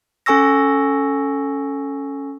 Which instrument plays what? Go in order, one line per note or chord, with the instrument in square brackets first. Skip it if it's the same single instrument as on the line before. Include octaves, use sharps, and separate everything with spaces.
[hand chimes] C#4 A4 G#5 C#6 E6 A#6